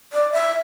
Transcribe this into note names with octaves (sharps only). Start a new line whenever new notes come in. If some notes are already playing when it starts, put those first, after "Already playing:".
D5
E5